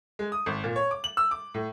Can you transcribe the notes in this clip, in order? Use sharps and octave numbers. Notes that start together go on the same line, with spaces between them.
G#3
D#6
G#1
A#2
C#5
D6
F#7
E6
D6
A2